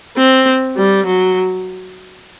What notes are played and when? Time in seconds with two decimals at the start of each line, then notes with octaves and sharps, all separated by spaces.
0.17 C4
0.77 G3
1.06 F#3